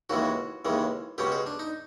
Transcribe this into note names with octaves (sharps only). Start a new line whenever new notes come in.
D#2 C#3 E3 G#3 F#4
D#2 C#3 E3 G#3
C#2 B2 G#3 C#4 G4
G#4
D4
D#4